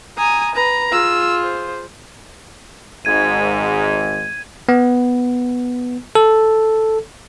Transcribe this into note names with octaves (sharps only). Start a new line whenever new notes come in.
G#5 A#5 D#6
B4 A#5
F4 G#4 E6
C5
G#1 G#2 G#6 D#7
B3
A4